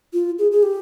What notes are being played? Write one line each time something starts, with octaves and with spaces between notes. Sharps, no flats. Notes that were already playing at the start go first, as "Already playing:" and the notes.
F4
G#4
G#4
G4